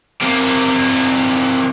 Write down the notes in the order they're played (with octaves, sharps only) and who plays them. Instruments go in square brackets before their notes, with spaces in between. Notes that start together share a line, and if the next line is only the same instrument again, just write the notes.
[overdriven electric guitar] C3 A#3